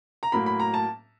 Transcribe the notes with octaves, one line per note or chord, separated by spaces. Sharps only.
A#5
A2 F#3 A#3 B5
B5
A#5
A5